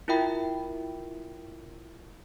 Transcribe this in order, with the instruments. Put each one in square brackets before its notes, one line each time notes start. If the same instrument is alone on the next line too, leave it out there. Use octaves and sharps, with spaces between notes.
[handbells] E4 F4 A#4 E5 G5 B5